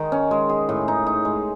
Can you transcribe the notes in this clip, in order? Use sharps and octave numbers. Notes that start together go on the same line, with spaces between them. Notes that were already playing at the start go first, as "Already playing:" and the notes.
Already playing: D#3 G#3
C#4
G#3
G#4
A2
D#4
D#4
G#3